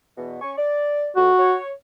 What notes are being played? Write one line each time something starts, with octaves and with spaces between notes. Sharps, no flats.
E2 B2
C#4 G#5 C#6
D5
F2 F#4
C#5